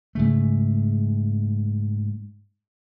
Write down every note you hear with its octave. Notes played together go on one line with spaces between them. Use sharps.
G#2 C#3 A3